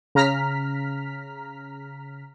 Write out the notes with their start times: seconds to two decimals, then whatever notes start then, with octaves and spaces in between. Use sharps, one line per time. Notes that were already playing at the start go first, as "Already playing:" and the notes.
0.15 C#3 A#5 F6 B6